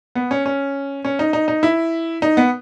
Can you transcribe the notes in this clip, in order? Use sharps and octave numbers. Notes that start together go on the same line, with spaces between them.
B3
C#4
C#4
C#4
D#4
D#4
D#4
E4
D#4
B3